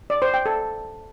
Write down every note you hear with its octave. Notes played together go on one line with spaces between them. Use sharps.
D5
C5
G5
A4